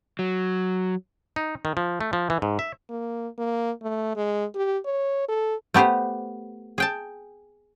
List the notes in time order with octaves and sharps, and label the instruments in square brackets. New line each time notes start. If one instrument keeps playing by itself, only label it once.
[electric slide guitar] F#3
[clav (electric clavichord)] D#4
D#3
F3
A3
F3
E3
G#2
E5
[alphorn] A#3
A#3
A3
G#3
G4
C#5
A4
[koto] A3 B3 G4 B4 C5
G#4 G5 A5